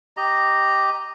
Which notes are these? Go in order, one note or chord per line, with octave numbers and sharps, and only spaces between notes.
G4 D#5 A#5